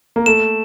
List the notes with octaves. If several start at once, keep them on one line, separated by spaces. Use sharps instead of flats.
A#3
A3 E7